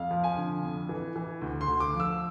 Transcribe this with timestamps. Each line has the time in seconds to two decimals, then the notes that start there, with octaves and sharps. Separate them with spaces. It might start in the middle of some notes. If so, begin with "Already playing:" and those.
Already playing: F2 F5
0.11 F3
0.24 G#5
0.37 D3
0.63 F2
0.89 E3
1.16 E3
1.41 D2
1.61 C6
1.68 D2
1.80 D6
1.94 F3
2.00 E6